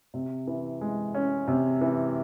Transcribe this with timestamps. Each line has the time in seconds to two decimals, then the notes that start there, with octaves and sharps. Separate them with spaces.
0.14 C3
0.47 E3
0.81 G#3
1.14 C#4
1.48 C3
1.81 E3